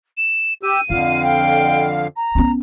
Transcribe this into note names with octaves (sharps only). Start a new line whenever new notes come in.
E7
G4 E6 D#7
F2 D3 F4 F5
G5
A#5
B3 C#4